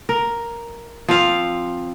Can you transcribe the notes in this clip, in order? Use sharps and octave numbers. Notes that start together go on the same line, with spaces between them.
A#4
F3 C4 F5